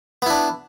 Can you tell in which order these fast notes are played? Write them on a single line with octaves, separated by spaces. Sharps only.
B3 E4 D4